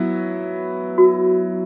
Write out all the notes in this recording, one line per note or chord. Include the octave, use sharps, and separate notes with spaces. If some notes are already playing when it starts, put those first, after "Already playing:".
Already playing: F#3 B3 E4
F#4